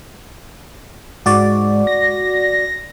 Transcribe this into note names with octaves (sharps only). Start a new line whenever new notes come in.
G#2 F#4 D5
A#6